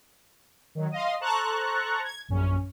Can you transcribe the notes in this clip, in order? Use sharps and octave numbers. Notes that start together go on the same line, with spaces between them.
D#3 F#3
D#5 F5 C6
A4 C5 A5 A#5 C#6 F#6
G#6
A#1 F#2 C#4